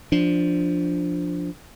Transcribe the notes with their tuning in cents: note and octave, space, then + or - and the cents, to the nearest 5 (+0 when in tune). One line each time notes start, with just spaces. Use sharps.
F3 +0 D4 +0